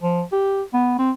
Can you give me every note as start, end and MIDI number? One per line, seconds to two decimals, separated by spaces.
0.03 0.23 53
0.32 0.63 67
0.73 0.94 59
0.98 1.11 60